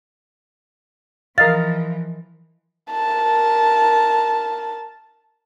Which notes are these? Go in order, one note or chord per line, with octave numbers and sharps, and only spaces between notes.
E3 F3 A#4 D#5 F5 A6
A#4 A5